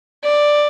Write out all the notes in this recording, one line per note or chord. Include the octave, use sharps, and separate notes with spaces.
D5